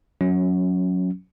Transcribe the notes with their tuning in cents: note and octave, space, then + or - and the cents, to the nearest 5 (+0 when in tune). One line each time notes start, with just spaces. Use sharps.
F#3 -20 C#4 +0